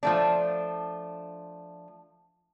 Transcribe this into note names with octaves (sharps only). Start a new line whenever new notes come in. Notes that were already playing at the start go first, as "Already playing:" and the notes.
F3 A3 D4